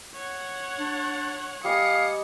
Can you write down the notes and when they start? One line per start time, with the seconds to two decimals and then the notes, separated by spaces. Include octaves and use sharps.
0.15 C#5 F#5
0.79 D4
1.64 G3 D#5 F5 G#5 D#6 C#7